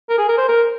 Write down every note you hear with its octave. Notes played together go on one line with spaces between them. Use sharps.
A#4
G#4
A#4
C5
A#4